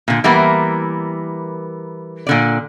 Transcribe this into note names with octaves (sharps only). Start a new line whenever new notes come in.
A#2 D3
E3 G3 A#3 B3 E4 A#4
A#2 D3 D5